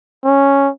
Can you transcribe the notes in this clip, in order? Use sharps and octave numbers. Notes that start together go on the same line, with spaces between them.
C#4